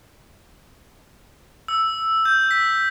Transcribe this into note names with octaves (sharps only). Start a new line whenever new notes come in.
E6
G6
B6